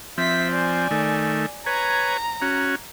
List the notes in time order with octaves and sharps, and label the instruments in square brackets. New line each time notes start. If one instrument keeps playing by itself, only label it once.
[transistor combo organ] F3 C4 [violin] E5 B6
[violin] D5 G#5
[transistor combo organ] D#3 A3
[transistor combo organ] B4 C#5 G#5 [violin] A#5
[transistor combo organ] C#4 F#4